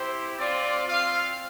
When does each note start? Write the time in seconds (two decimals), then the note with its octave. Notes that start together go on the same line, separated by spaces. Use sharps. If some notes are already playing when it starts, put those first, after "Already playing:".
Already playing: C4 E4 G4 C5
0.38 C4 F4 D5
0.87 C4 F4 F5